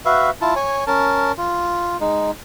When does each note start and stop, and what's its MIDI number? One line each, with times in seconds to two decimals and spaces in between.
0.05 0.30 66
0.05 0.30 71
0.05 0.30 76
0.05 0.30 77
0.41 0.54 64
0.41 0.54 65
0.41 0.54 81
0.56 0.84 73
0.56 0.84 80
0.87 1.32 61
0.87 1.32 70
0.87 1.32 81
1.38 1.97 65
2.01 2.31 56
2.01 2.31 63